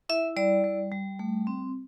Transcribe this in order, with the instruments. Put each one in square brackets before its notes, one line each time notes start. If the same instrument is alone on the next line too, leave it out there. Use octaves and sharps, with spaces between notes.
[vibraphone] E4 E5
G3 D5
G3
G3
A3
C4